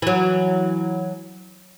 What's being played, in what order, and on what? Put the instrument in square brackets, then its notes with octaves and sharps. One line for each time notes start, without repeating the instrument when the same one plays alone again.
[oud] E3 F#3